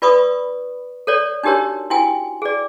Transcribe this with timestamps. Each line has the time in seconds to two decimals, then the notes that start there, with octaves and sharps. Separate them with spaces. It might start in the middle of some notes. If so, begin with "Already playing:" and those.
0.02 F4 B4 D5 B5 C#6 D#6
1.07 A4 C#5 D5
1.43 D4 D#4 F#4 G4 A#4 C#5
1.90 E4 F#4 G5 G#5
2.42 G#4 D5